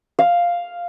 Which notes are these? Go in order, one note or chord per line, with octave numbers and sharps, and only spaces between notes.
F5